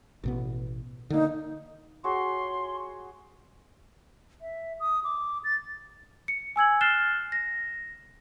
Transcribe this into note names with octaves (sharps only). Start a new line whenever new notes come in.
A1 B2 B3
D3 A#3 D#4
F#4 G#4 C#5 C6
E5
D#6
D6
A6
C#7
G#5 E6 G#6 F#7
F6 F#6 A6 C7 E7 G7
A#6